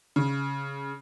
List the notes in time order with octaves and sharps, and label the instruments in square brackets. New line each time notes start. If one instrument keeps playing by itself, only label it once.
[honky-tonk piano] C#3